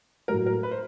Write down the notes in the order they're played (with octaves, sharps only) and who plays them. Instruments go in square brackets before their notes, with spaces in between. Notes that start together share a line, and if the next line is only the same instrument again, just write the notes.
[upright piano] A2 F#3 A3 [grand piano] A#4
[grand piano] A#4
B4
C5